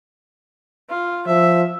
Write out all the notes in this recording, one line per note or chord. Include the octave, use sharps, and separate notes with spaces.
F4
F3 E5